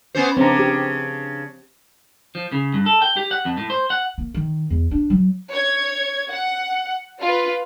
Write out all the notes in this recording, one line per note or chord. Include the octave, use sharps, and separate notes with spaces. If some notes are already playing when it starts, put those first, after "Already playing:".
B3 C#4 C5
C#3 C4 D4 A#5
G4
F3
C#3
G2
A4
G5
G4
F#5
F2
A2
C5
F#5
A#3
D#3
E2
D4
F#3
C#5 G#6
F#5
F4 B4